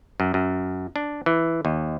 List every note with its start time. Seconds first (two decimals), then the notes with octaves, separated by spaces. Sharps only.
0.20 F#2
0.34 F#2
0.96 D4
1.26 E3
1.65 D#2